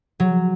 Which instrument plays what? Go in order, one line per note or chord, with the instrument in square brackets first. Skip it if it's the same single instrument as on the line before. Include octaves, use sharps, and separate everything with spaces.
[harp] F#3